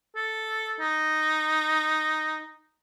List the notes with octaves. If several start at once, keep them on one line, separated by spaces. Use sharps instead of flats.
A4
D#4